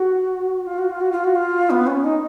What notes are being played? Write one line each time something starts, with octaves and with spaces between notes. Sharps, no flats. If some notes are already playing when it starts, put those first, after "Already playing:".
Already playing: F#4
F4
F#4
F4
F#4
F4
F#4
F4
B3
C#4
D#4